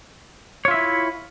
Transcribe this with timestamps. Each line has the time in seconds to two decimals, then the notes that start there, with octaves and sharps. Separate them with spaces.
0.65 C#5
0.68 F4
0.71 E5
0.74 E4